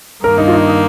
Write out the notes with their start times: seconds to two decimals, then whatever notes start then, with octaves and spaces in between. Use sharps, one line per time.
0.23 G2 D#3 A#3 A#4
0.38 D#4
0.47 F4
0.53 D#4
0.68 D#4